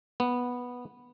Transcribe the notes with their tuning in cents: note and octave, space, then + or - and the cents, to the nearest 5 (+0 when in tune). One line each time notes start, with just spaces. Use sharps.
B3 -5